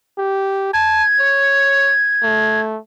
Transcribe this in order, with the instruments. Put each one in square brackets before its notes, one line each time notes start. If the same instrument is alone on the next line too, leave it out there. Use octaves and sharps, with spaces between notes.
[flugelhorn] G4
[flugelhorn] A5 [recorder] G#6
[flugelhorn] C#5
A3